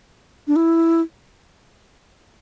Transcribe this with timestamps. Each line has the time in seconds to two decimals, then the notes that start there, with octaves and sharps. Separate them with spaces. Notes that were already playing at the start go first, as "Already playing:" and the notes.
0.48 D4
0.56 E4